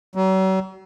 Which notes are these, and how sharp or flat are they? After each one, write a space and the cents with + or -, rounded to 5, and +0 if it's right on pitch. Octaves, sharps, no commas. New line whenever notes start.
F#3 +40